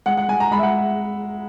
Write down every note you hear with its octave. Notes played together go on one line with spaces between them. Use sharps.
G#3 F#5
F#5
G#3 G#5
A#5
G#3 B5
E5
F#5